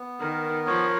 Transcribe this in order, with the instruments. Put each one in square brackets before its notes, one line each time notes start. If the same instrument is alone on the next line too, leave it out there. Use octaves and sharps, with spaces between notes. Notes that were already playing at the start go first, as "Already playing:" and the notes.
Already playing: [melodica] B3
[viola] D#3 [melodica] A#4
[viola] F3 [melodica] C#5